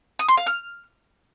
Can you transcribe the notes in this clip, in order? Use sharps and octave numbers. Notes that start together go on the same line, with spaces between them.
D#6
C6
F5
F6